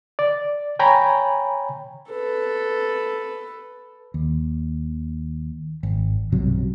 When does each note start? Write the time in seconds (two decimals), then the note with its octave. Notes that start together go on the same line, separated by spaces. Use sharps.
0.19 D5
0.79 C#5 G5 G#5 A#5 B5
2.10 A4 B4
4.14 D#2
5.83 G#1
6.32 B1 G2 C3 F#3